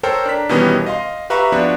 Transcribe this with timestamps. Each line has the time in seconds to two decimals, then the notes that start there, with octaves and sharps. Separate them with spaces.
0.03 A4 A#4 C5 C#5 G5
0.25 D4 A#5 B6
0.49 B2 D#3 E3 G3 B3 C#4
0.86 D#5 F5 C6
1.30 G4 B4 E5 F5 A#5 C#6
1.52 F3 B3 D4 F#4